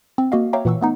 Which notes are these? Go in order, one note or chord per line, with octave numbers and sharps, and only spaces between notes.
C4
A#3 F#4 D#5 F5
C#5 E5 F5 G5 A#5 D6
A#2 E3 F#5 C#6 E6
A3 B3 D#4